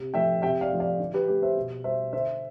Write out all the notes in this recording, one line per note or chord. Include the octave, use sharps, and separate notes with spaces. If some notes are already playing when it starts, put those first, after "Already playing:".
Already playing: C3
F3 A3 E5 G5
C3 E5 G5
D5 F5
F3 A3
D5 F5
D3
G4 B4
A3 G4
C5 E5
B2
G3 C5 E5
D3 C5 E5